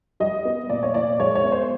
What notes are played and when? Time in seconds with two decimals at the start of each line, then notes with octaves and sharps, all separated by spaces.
0.20 G3 D#5
0.45 B3
0.70 A#2 D5
0.83 C#5
0.94 A#2 D5
1.20 G#3 C#5
1.35 C#5
1.44 B3
1.52 C5